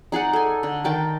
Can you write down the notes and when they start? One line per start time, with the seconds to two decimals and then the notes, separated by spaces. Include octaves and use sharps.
0.12 D#4 G#4 D5 F#5
0.33 A4 G#5
0.63 D3
0.84 D#3 G5 A5 A#5